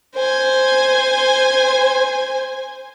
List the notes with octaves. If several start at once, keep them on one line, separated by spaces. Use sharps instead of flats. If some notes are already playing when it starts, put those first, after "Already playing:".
C5 G#5